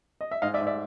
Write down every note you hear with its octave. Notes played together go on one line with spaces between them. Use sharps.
D#5
E5
G#2 D#5 F5
D5 E5
G#2
D5 E5